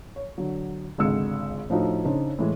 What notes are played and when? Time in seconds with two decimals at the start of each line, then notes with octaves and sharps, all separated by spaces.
0.16 C#5
0.38 D3 F#3
0.98 G#1 C#2 D3 G#3 E6 C#7
1.70 A2 F3 D4 D#4 F#4
2.05 C#3 D4 D#4 C5
2.39 A2 E3 G#3